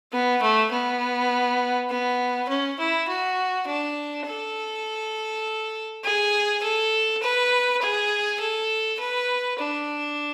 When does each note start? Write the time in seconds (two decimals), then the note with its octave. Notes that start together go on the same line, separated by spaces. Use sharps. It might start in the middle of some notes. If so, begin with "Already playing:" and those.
0.12 B3
0.42 A3
0.72 B3
1.90 B3
2.49 C#4
2.79 E4
3.08 F#4
3.67 D4
4.27 A4
6.04 G#4
6.63 A4
7.22 B4
7.82 G#4
8.40 A4
9.00 B4
9.59 D4